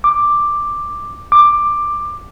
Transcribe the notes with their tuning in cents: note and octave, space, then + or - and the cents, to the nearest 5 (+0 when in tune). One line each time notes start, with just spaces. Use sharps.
D6 +5
D6 +10